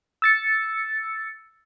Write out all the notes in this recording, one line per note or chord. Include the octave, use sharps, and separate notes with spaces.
E6 A6 C#7